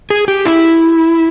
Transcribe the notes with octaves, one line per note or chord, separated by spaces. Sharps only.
G#4
G4
E4